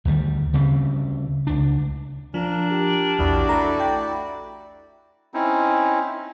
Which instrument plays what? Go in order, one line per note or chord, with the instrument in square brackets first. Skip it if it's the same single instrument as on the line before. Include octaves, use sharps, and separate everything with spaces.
[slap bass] D2 D#3 F3 G3
D2 C#3 G3 C4
C#2 D4
[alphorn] A#2 [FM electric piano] F3 [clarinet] D4 [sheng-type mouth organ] A#4
[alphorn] G4
[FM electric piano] A#1 E2 [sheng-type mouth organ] E4 F#4 D5
[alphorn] A3 [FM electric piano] A#5
[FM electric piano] G5
[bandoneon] C4 C#4 D#4 E4